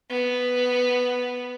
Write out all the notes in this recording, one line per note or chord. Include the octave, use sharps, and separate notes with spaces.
B3